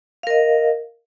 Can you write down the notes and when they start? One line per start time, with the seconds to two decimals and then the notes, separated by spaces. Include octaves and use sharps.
0.23 F5
0.27 A#4
0.30 D#5